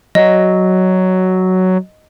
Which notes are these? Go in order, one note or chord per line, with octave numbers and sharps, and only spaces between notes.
F#3 D#5